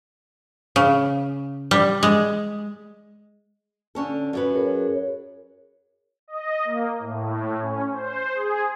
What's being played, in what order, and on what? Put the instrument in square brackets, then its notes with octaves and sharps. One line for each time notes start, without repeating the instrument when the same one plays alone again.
[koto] C#3
G3
G#3
[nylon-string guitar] D3 C#4 A4
F#2 F#3 B4
[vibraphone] G#4 A#4 C#5
[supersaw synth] D#5
A#3
A2
A2
C#4
C5
G#4